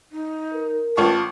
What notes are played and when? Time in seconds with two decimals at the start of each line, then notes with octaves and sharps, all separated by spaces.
0.12 D#4
0.54 A#4
0.97 A1 F4 A5 C#6